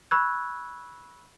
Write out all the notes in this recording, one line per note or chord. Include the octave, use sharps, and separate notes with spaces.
B5 C#6 E6 F#6 G#6